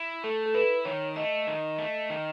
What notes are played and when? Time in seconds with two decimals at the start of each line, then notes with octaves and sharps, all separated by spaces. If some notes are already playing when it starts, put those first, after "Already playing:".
Already playing: E4
0.24 A3 A4
0.46 A4
0.54 E4 B4
0.85 D#3 C#5
1.16 A3 D#5
1.47 D#3
1.78 A3
2.10 D#3